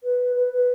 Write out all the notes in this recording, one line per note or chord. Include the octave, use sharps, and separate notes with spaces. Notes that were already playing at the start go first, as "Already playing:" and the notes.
B4
B4
B4